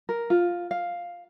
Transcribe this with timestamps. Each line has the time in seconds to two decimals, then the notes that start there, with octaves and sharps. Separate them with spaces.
0.09 A#4
0.30 F4
0.71 F5